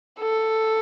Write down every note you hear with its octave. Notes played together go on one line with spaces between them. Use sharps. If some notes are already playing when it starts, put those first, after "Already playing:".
A4